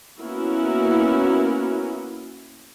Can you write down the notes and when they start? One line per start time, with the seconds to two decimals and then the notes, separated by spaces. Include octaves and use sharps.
0.19 A#3 B3 C#4 E4 F#4 A#4